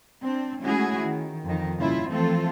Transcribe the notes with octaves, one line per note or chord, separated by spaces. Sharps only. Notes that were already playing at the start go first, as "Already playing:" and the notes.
C4 D4
G#3 A3 C#4 E4 F#4 G#4
D#3
F2 D#3
G2 A#2 C#3 E4 F4
E3 F3 A3 C4 F4 A4